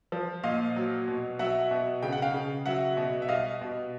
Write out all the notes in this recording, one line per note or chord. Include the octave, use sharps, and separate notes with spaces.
F3
A#2 D#5 F5
F#3
B2
F#3 E5 F#5
B2
C#3 G5
F#5
F5 G5
C#3
F#3 E5 F#5
B2
E5
G3 D#5 F5
B2